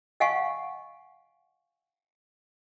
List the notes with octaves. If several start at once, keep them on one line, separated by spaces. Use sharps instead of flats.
D#5 F5 F#5 G#5 A5 C#6